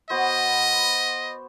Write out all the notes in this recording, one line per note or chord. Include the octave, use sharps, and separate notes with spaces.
B3 F#4 C5 D#5